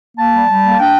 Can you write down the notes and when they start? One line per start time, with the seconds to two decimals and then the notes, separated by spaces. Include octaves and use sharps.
0.17 A#3 A5
0.33 G3
0.49 G3
0.64 A#3
0.79 D4 G5